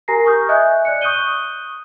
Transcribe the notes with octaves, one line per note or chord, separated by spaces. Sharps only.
G4 A#4 G#5 A#5 A#6 C7
C#6 D#6 F6 G6
D#5 E5 G#5 F#6 G6
D5 F#6 C#7
C#6 D#6 F#6 G6 D#7 G7